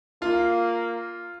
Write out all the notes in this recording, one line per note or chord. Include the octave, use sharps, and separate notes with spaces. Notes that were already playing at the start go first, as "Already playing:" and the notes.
A#3 F4